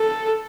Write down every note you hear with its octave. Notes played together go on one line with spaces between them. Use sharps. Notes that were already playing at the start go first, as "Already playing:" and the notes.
Already playing: A4